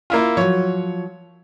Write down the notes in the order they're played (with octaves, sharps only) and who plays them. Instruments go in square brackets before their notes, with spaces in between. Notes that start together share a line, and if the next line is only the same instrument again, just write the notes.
[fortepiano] A#3 E4 F4
[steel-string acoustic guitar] F3 F#3 [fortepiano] C#5